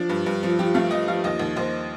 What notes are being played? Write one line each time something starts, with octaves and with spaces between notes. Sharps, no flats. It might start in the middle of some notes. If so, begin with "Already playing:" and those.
Already playing: F3 D4
G2
G2
F3
F3 G4
A3 F5
F3 D#5
F3 F5
D#2 D#5
D#2
D#2 C5